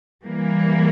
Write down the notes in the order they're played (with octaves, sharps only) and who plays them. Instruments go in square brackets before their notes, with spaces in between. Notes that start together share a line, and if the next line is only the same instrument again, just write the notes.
[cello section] E3 G3 A#3